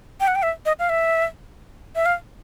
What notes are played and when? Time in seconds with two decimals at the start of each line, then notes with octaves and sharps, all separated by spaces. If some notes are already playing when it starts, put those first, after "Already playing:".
0.20 G5
0.28 F#5
0.35 G5
0.43 E5
0.66 D#5
0.79 F5
0.89 E5
1.95 E5
2.06 F5